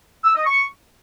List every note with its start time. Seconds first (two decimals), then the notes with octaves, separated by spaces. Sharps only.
0.24 E6
0.35 D#5
0.46 C#6